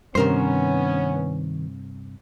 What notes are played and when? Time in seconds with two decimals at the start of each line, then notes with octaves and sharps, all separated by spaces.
0.15 G2 C3 D#3 B3 C#4 A#4 C5